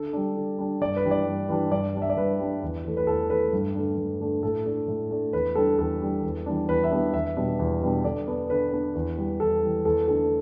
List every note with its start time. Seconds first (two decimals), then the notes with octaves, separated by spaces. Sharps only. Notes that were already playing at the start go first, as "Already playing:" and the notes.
Already playing: D3 A4
0.13 G3 D4
0.36 D3
0.58 G3 D4
0.81 G2 D5
0.96 B4
1.04 E3 G3 D4
1.11 D5
1.26 G2
1.49 E3 G3 D4
1.71 G2 D5
1.94 G3 D4
2.02 E5
2.10 D5
2.17 G2 B4
2.40 G3 D4
2.62 E2
2.85 E3 A3
2.97 B4
3.07 E2 A4
3.30 E3 A3 B4
3.53 G2
3.75 D3 A3 D4
3.97 G2
4.20 D3 A3 D4
4.43 A2 A4
4.66 A3 D4
4.88 A2
5.11 A3 D4
5.33 E2 B4
5.55 D3 G3 D4 A4
5.79 E2 A4
6.01 D3 G3 D4
6.23 E2
6.46 E3 G3 B3 D4
6.69 E2 B4
6.84 E5
6.91 E3 G3 B3 D4
7.14 E2 E5
7.37 B2 G3 B3 D4
7.59 E2
7.82 B2 G3 B3 D4
8.05 D3 D5
8.27 B3 D4
8.50 D3 B4
8.72 B3 D4
8.95 E2
9.17 E3 G3
9.40 E2 A4
9.63 E3 G3
9.85 E2 A4
10.08 D3 A3 D4 A4